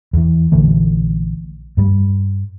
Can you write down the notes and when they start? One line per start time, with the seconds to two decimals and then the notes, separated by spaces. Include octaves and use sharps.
0.13 E2 E3
0.52 A#1 D3 E3 A3
1.77 G2 G3